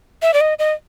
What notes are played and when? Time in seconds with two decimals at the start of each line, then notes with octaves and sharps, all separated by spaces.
0.22 E5
0.34 D5
0.41 D#5
0.59 D#5